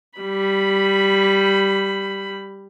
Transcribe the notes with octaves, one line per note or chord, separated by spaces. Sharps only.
G3 B5